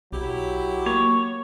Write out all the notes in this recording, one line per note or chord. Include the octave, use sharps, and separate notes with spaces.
B1 F#3 E4 G4
A#3 C#5